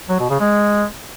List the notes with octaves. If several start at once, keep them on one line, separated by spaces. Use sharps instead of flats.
F#3
B2
C#3
G#3